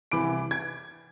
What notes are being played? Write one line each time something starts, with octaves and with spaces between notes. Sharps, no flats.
C2 E3 B5 D6 D7
G#6